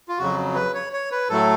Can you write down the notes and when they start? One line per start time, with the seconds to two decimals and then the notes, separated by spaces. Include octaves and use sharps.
0.09 F4
0.19 F2 C#3 F#3 F#4
0.55 B4
0.74 C#5
0.93 C#5
1.12 B4
1.29 A2 F#3 A3 A4